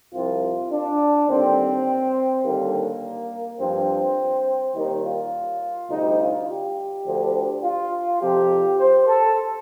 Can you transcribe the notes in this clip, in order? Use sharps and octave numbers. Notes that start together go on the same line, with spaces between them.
C2 C3 F3 F4
D4
D#2 D3 G3 C4
D#2 D3 G3 A#3
G2 F3 C4
D#2 D#3 G3 D#4
F4
D2 C3 G3 D#4
F4
G4
D2 D3 F3
F4
F2 C3 F3 G4
C5
A4